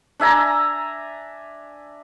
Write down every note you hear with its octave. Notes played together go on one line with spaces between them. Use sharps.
D4 E5 G#5 A#5